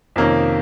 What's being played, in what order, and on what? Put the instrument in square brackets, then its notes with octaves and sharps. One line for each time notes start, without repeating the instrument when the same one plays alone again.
[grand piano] F2 C3 D#3 A#3 C#4